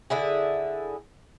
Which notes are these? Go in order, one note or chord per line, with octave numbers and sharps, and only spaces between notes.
D3 E4 G#4